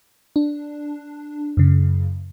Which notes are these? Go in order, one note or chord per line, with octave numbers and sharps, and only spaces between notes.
D4
F#2 C#3